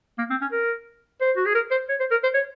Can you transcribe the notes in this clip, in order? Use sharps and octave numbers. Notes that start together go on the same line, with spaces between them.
A#3
C4
C#4
A#4
C5
F#4
G#4
A#4
C5
C#5
C5
A#4
C5
C#5